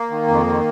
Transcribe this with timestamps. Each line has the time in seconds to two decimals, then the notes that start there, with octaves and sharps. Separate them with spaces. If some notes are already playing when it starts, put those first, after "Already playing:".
Already playing: A#3
0.10 D#3
0.28 F2
0.46 D#3